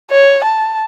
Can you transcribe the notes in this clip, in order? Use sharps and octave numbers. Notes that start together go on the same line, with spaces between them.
C#5
A5